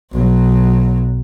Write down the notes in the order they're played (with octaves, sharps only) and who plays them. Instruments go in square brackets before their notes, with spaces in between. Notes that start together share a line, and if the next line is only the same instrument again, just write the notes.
[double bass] B1 F#3